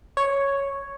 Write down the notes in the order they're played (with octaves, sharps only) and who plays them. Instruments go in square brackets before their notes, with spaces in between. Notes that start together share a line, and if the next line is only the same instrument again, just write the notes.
[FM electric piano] C#5